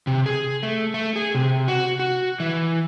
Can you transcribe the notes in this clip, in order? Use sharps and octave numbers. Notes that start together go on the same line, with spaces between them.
C3
G#4
A3
A3
G#4
C3
F#4
F#4
E3